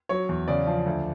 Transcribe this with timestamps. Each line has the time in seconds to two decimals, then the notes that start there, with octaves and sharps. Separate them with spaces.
0.09 F#3 C#5
0.29 E2
0.48 C#3 D5
0.67 F3
0.86 D2